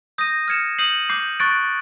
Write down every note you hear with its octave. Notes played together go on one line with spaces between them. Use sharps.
D#6 G6 A#6 D#7
F6 G#6 C#7 E7
D#6 G6 C7 D#7 F#7
D6 G6 C7
C#6 F#6 A6 D7